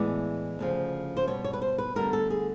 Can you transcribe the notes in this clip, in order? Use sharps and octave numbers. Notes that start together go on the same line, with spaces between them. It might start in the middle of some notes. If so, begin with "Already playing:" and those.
Already playing: A2 E3 G#3 B3 D5
D2 C#3 F3
C5
B2 G3 B3 C#5
C#5
B4
C5
B4
D2 D3 G3 B3 A#4
A4
G#4